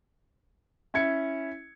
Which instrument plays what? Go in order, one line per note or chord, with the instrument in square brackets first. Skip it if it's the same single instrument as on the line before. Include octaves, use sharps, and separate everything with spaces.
[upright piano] C#4 E4 G#6 C#7